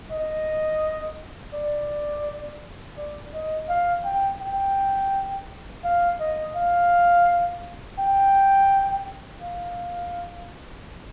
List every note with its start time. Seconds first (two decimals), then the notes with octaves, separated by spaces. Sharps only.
0.11 D#5
1.54 D5
2.98 D5
3.34 D#5
3.69 F5
4.05 G5
4.41 G5
5.85 F5
6.20 D#5
6.56 F5
7.99 G5
9.43 F5